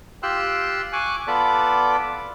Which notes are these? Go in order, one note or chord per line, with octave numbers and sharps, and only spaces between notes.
F4 G4 G5 C6 E6 F#6
G#5 C#6 D6 F#6
B3 F4 A4 D5 B5 D6